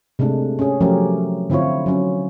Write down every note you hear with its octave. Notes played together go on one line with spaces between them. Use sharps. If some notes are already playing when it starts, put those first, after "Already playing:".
C3 G#3 A3 D4
C#4 G#4
F3 F#3 A3 C#4 G4 A#4
D3 C4 E4 F4 C#5
F#3 C#4